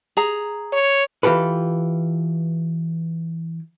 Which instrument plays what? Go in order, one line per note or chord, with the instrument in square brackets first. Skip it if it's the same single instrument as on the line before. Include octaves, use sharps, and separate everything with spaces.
[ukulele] G#4 A#5
[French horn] C#5
[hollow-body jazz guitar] E3 F4 G4 A4 B4